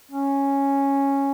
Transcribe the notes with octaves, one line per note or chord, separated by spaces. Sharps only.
C#4